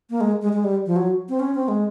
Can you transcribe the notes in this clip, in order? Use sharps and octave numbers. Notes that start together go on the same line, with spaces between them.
A#3
G#3
G#3
G#3
G3
F3
F#3
C4
C#4
C4
G#3